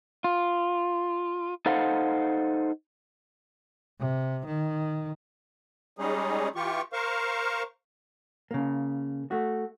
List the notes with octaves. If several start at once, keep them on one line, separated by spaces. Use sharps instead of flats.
F4
D#4 A4 C5 F5 F#5
C3
D#3
G3 G#3 C#4 D#4 G#4
E3 F4 G4 C#6
A#4 C5 F5 C#6
C#3 A#3
A3 F#4